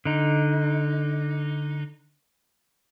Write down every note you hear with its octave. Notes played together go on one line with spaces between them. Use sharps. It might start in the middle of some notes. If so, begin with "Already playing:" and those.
D3 D#4